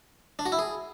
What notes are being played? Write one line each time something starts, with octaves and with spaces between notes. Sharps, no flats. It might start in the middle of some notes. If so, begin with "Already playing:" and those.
D4
F#4
E4
G#4